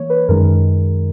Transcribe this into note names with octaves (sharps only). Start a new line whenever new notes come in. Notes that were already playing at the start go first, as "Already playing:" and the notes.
Already playing: E3 A#3 C#5
B4
F#2 D#3 G#3 A#4